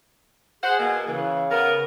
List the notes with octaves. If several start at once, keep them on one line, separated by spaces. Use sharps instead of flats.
G#4 C5 F#5
B2 A#3
C#3 E3
B3 A#4